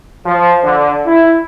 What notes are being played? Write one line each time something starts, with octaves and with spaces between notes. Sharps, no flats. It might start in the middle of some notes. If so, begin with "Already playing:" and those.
F3
D3
E4